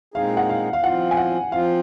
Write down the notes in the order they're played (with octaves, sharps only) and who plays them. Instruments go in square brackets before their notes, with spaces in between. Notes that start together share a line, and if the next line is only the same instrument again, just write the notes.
[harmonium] A#2 G#3 C4 D#4 G#4 [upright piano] F5
[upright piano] F#5
F5
F5
[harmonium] F3 C4 F4 [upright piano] F#5
[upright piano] G#5
F#5
[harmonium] F3 C4 F4 [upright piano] F5